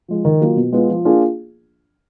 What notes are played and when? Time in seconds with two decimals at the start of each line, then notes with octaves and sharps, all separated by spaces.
0.08 F3 G#3
0.25 D#3
0.41 F#3 A#3 F4
0.56 B2
0.73 G#3 B3 F4
0.89 F3
1.05 A#3 D4 F4 G#4